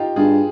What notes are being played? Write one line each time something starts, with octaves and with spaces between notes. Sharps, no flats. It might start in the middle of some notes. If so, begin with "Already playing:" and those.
Already playing: D#4 F4 G4
G2 F4 G#4